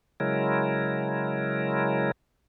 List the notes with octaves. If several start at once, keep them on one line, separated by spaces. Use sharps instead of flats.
C#3 F#3 G#3 E4 A#4